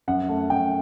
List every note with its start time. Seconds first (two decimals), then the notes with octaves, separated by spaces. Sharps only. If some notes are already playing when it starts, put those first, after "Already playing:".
0.08 F#2 F#5
0.29 A3
0.50 F#2 G5